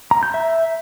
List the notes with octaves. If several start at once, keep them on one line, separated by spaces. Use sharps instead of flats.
A#5
G6
E5